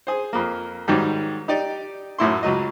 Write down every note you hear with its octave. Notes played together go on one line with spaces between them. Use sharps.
G#4 C5
F2 A#3
G#2 D#3 F#3 G3
D#4 G4 D5
F#2 A2 E4 C6
C#2 F#3 D#5